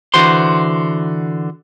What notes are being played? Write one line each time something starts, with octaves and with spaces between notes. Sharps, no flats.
D3 E3 F#4 C5 C6